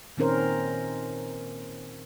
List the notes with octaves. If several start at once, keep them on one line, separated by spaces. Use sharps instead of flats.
A#2 D#3 C4 C#4 A#4 C5